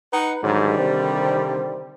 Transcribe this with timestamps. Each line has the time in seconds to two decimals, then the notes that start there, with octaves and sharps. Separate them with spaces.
0.13 D#4 B4 F#5
0.43 G#2 D3 D#3 F#3 G3
0.79 C3 C4